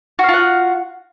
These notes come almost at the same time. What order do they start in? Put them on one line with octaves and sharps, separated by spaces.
F#4 F5 F4 F#5